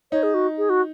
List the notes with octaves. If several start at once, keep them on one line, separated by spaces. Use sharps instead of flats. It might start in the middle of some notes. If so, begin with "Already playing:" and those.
D#4 C#5
G#4
F#4
G#4
F#4